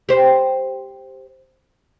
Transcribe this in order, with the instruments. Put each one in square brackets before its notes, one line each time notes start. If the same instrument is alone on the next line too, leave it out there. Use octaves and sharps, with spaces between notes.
[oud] G4 C5